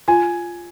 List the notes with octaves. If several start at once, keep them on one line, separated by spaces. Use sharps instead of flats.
F4 G#5